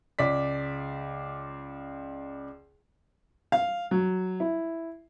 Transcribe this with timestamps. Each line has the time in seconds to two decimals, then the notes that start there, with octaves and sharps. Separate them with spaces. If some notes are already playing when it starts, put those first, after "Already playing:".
0.19 C#2 D5 B6
3.52 F5
3.91 F#3
4.40 E4